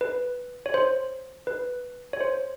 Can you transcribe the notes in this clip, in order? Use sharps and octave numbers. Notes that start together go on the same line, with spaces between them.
B4
C#5
C5
B4
C#5
C5